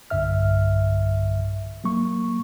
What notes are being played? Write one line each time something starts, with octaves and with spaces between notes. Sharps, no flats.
B1 G2 D3 E5 F6
F#3 A#3 C#6